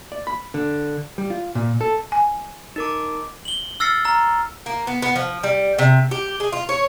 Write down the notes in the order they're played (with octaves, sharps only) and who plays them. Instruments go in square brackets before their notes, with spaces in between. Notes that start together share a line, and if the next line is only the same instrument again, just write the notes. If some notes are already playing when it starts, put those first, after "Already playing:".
[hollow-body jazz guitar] D5
B5
D3
G3
F4
A#2
A4
[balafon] G#5
[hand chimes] D#4 A#4 D6
[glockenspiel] F#7 G7
E6 F6 A6 A#6 C7 C#7
A#5 F6
[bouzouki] A#3
B3
B3
F3
G3
C3
G4
G#4
F4
C#5